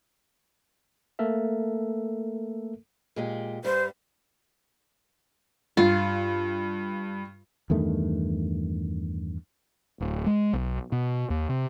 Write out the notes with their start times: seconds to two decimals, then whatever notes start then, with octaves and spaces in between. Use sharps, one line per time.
1.19 A3 A#3 A4 A#4 E5
3.16 A#2 G#3 G4
3.64 G2 G3 C5
5.77 G2 F4
7.70 E2 G2 D#3 A3
10.00 D1
10.26 G#3
10.53 B1
10.92 B2
11.30 D#2
11.49 C3